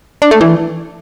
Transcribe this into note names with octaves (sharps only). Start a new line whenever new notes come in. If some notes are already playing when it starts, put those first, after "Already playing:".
D4
A3
E3